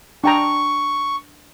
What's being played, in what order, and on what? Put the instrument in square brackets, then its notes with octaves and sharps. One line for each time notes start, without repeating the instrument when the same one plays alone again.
[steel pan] D4 G5 A#5 [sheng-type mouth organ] C#6